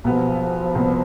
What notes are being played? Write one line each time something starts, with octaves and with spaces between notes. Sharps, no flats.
B1 B2 F3 G3 B3
C2 B2 B3